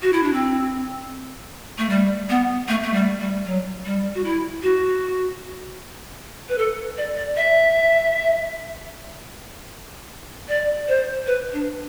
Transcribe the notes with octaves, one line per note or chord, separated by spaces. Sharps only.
F#4
E4
D4
C4
A3
G3
B3
A3
A3
G3
G3
F#3
G3
F#4
E4
F#4
B4
A4
D5
D5
E5
D5
C5
B4
D4